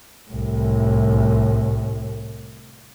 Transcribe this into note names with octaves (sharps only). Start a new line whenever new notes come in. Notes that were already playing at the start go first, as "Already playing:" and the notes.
C2 A2